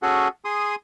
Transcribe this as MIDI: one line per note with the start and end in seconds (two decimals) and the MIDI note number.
0.03 0.28 61
0.03 0.28 66
0.03 0.28 68
0.03 0.28 69
0.03 0.28 78
0.45 0.75 68
0.45 0.75 84
0.45 0.75 87